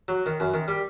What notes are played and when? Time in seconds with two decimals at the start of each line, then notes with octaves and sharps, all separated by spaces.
0.08 F#3
0.26 D#3
0.40 F#2
0.54 D#3
0.68 G3